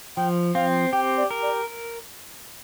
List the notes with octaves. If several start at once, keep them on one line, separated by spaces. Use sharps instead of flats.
F3 G5
C4 F5
G4 G5
D5
A#4
D5